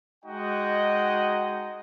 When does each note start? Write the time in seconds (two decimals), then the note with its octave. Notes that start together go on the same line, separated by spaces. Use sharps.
0.25 G#3 D#4 F#4 D#5 F#5 G5